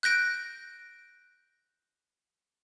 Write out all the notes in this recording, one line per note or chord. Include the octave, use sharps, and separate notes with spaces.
F#6 G6 A#6 D7